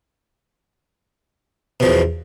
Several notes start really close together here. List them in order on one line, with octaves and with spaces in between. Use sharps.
B2 F3 E2